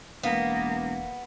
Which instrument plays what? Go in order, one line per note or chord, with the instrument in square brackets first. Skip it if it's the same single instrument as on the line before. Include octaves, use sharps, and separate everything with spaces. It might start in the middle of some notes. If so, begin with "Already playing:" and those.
[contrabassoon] E1 [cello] A#3 [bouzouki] B3 [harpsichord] A#4 F5